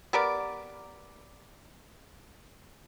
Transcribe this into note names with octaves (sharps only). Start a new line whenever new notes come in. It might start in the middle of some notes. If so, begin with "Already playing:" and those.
B3 G4 A#4 D5